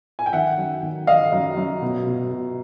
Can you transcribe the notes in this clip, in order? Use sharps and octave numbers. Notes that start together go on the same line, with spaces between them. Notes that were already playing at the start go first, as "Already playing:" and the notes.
G#5
G5
D#3 E5 F#5
F#2
D#3
D#3 D#5 F5
F#2
F#2
B2
B2
B2